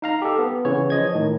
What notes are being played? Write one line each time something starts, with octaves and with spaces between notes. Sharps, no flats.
D#4 F5 A#5
G4 A4
B3
C#3 E3 C#5
F3 D#5 G#6
A2 D#3